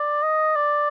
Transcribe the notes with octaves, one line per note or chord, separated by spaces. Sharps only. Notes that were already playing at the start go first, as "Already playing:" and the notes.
Already playing: D5
D#5
D5